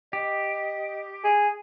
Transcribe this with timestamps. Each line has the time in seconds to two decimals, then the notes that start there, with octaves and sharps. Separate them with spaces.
0.13 G4 D#5
1.24 G#4